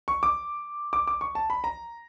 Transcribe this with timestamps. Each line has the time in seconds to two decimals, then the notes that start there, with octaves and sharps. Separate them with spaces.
0.08 C#6
0.23 D6
0.93 D6
1.07 D6
1.21 C#6
1.35 A5
1.50 B5
1.64 A#5